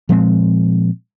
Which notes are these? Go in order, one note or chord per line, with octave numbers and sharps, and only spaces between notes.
A#2 F3 G#3 C4